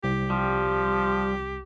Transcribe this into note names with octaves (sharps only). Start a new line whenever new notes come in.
C2 G4
F3 G3